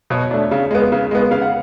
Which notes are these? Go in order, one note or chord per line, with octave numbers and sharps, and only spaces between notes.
B2 C#5
A3 D4
C#3
G#3 B3
C#3
G#3 B3
C#3 F5
F#5